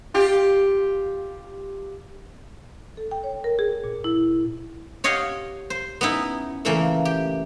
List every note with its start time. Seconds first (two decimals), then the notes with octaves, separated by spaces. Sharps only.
0.14 F4 G4
2.97 A4
3.11 G5
3.24 C#5
3.44 A#4
3.59 G#4
3.84 A#2
4.04 E4
5.04 G4 C#5 D#5 F5 F#5 G#5
5.70 C5
6.01 B3 C#4 D#4 E4
6.65 A#2 C#3 E3 A3 A#3
7.05 G4